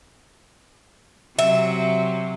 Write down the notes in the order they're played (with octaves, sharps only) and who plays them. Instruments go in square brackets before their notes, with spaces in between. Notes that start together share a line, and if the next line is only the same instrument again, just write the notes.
[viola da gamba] C3 F#3 [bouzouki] E5